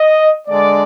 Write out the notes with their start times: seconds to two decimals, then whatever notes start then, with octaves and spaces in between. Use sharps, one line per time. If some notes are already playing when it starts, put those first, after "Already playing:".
Already playing: D#5
0.47 D3 G#3 D4 D5